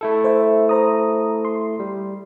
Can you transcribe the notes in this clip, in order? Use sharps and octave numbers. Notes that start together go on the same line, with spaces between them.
A3 E4 A4
C5 E5
C5 A#5 D#6
C6
G3